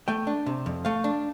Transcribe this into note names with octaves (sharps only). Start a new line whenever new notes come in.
A3 G5
D4
C3
F2
A3 F5
D4